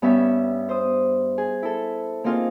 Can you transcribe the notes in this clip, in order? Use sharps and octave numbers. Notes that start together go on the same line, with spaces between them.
G2 B3 C#4 G4 E5
C5 D#6
G#4
E4 A4
A#3 C4 D#4 F4 G#4